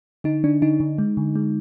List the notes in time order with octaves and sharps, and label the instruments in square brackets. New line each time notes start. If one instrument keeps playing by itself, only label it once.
[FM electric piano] D3 D#4
D3 D4
D3 D#4
D3
G#3
D3
G#3